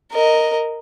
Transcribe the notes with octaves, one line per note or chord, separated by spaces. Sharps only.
A#4 D#5